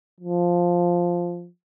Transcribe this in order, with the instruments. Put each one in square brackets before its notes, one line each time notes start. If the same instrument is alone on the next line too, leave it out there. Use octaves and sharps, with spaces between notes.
[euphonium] F3